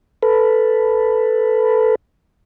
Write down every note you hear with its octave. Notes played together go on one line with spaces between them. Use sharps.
A4 B4